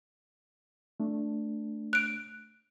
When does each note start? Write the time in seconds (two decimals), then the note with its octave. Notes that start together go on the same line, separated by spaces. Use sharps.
1.00 A3 D4
1.93 F#6 D7